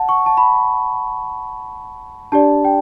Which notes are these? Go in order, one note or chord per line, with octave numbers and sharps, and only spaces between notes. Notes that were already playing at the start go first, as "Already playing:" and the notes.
Already playing: F#5 A5
C#6
A5
B5
D4 G4 D5 A5
G5